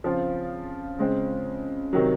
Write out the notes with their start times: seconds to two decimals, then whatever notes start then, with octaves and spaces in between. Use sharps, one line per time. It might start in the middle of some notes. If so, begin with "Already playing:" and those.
0.04 C#3 F3 C4 F4
0.98 C#3 G#3 C4
1.93 C3 D#3 F#3